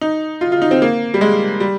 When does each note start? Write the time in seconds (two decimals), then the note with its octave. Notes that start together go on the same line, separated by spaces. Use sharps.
0.01 D#4
0.41 F4
0.52 F4
0.62 D#4
0.71 C4
0.82 A#3
1.14 G3
1.21 G#3
1.60 G3